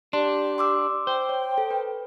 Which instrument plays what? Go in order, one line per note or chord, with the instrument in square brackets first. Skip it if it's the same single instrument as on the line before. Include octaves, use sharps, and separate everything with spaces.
[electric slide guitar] D4 [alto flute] G4 [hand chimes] C6
[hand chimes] C6 D6 E6
[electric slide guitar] C5 [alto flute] G5
[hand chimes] C#5
A4
B4